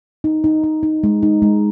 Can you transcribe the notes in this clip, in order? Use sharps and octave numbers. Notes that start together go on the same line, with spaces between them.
D#4
D#4
D#4
D#4
G#3
D#4
G#3